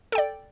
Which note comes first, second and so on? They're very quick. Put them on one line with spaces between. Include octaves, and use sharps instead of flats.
A4 G5 D5